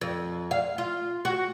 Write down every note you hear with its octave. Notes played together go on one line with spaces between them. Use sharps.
F2
F5
F4
F#4